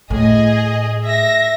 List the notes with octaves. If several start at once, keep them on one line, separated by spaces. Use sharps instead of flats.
A2 G#4 D#5
E5 A#6